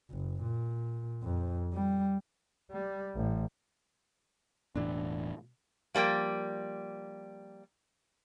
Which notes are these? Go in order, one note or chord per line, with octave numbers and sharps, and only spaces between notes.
F#1
A#2
F2
G3
G3
A1
E1 A2 E3 D4 E4
F3 G3 A#3 G5